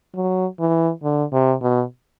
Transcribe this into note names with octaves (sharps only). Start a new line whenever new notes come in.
F#3
E3
D3
C3
B2